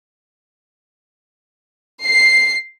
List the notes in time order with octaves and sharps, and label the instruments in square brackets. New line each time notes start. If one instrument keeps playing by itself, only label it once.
[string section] C7